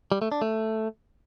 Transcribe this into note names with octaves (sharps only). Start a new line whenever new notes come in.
G3
A3
D4
A3